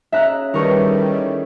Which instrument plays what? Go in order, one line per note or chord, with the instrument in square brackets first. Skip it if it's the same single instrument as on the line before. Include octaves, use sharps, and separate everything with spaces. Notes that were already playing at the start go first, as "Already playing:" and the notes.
[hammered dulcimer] C#3 [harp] E5 A#5 F#6
[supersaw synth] D#3 G3 [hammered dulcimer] E3 A3 C#5 [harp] A#4 C#6